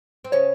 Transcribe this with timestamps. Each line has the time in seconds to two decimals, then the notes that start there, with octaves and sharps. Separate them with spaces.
0.24 C4
0.32 C#3 C#4 C#5